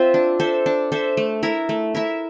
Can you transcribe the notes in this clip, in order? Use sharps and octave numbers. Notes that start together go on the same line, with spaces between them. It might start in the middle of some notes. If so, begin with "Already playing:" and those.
Already playing: C4 F4 C5 E5
D4
A4 C5 E5
D4
A4 C5 E5
A3
E4 A#4 E5
A3
E4 A#4 E5